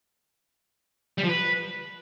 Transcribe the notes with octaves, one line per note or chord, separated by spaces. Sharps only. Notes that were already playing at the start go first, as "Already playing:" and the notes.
G3
F3
B4